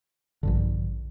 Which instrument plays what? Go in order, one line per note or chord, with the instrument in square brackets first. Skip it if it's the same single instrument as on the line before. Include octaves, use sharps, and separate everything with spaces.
[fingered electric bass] A#1 G2 D3